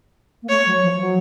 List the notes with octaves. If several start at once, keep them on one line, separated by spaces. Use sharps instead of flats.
A#3
A3 C#5
F#3
F3
F#3